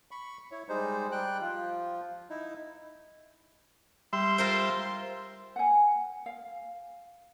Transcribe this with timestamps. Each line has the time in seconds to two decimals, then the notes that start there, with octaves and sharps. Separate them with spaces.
0.11 B5 C#6
0.51 E4 C#5
0.69 G3 G#3 D#4 C5
1.12 G3 G5 F#6
1.41 F3 F4
2.30 D#4 E4
4.13 G3 E5 C6
4.38 F4 A#4 C5
5.56 F#5 G#5
6.26 F5